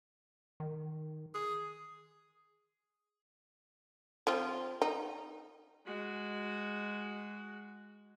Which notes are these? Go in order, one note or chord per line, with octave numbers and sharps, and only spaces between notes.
D#3
G#4
F3 C4 F4
D#4
G#3 F#4